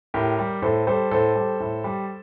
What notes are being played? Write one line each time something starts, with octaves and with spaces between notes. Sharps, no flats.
A2 G4 A#4
G3
A2 A4 C5
G3 A4 C5
A2 A4 C5
G3
A2
G3